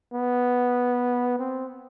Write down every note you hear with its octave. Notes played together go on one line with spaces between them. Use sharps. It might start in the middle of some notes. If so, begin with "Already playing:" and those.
B3
C4